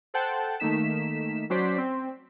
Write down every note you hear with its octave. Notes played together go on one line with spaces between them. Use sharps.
A4 C5 F#5 G5 A5
D#3 A3 A#3 D#4 B6 E7
F#3 C#4 F#4 C5 D5 B6
C4